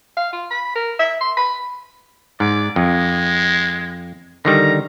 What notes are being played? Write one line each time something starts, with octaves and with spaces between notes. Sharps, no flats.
F5
F4
B5
A#4
E5
C6
B5
G#2 D5
F2 G#3
D3 D#3 G3 A#5